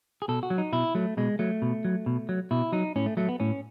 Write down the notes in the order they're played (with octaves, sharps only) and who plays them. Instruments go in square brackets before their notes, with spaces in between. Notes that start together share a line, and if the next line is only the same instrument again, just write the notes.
[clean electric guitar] G#4
B2 A4
F#4
F#3
D#4
B2 E4
F#3 A3
B2 G#3
F#3 A3
B2
F#3
B2
F#3
B2 E4
F#3 D#4
A2 C#4
A3
F#3 A3
B3
A2 C#4